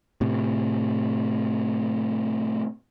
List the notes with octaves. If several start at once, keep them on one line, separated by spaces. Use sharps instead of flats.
A2 C3